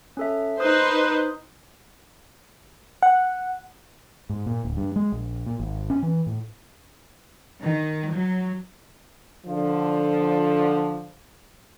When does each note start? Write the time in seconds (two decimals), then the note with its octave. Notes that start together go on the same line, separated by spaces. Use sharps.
0.17 C#4 A4 E5
0.60 D#4 B4 C5 D#6 G6
3.03 F#5
4.30 G#2
4.46 A#2
4.64 D1
4.77 G2
4.96 G#3
5.12 A#1
5.46 A#2
5.60 G#1
5.90 C#4
6.02 E3
6.26 A2
7.61 D#3
8.12 F#3
9.46 D3 F3